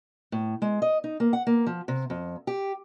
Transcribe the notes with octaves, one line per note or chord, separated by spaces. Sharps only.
A2
G#3
D#5
D#4
A#3
F#5
A#3
F3
C3
F2
G4